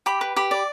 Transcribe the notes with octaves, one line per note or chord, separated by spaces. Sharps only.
G4 B5
B4
G4 B5
D5